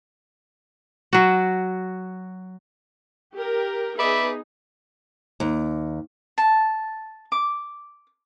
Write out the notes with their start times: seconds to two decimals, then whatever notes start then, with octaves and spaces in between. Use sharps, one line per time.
1.13 F#3 F#4
3.36 G4 A#4
3.99 B3 D#4 G#4 B4 D5 E5
5.40 D#2
6.38 A5
7.32 D6